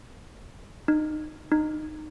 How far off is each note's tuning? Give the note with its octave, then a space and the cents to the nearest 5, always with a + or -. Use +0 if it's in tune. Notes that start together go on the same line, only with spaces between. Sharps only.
D#4 -25
D#4 -20